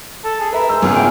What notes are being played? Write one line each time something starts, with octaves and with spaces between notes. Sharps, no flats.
A4
G#4
A#4 B4 E5 B5
G#3 E6 G6
G#1 C#2 C#3 B3 F4 G#4 F6
A3 E4 G5